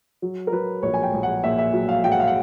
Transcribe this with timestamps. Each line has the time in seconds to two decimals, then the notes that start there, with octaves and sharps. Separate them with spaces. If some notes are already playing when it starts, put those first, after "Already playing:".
0.22 F#3
0.47 A#4
0.52 F#3 B4
0.82 A#1 C#5
0.94 G#5
1.03 G5
1.13 A#1
1.23 F#5
1.44 A#2 E5
1.58 E5
1.73 F#3
1.89 F5
2.04 F#3 G5
2.12 F#5
2.20 F5
2.27 F#5